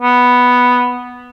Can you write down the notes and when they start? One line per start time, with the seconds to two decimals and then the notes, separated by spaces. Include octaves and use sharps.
0.02 B3